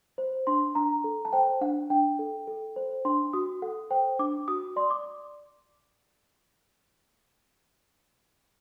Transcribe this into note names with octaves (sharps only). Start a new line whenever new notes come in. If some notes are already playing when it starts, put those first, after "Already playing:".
C5
D4 C6
D4 A#5
A4
A5
C5 G5
D4 F#5
D4 G5
A4
A4
C5
D4 C6
F#4 D#6
A4 F#5
C5 G5
D4 D6
F#4 D#6
D5 C6
D6